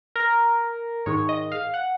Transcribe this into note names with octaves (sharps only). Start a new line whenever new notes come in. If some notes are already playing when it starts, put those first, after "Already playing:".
A#4
G#2 D#3 G#3 C#5
D#5
F5
F#5